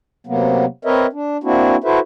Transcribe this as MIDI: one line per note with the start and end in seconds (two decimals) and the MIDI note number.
0.27 0.65 48
0.27 0.65 54
0.27 0.65 58
0.27 0.65 59
0.85 1.06 60
0.85 1.06 70
0.85 1.06 71
0.85 1.06 73
0.85 1.06 75
0.85 1.06 76
1.13 1.37 62
1.44 1.76 58
1.44 1.76 60
1.44 1.76 62
1.44 1.76 64
1.44 1.76 66
1.84 1.99 64
1.84 1.99 66
1.84 1.99 69
1.84 1.99 71
1.84 1.99 72
1.84 1.99 76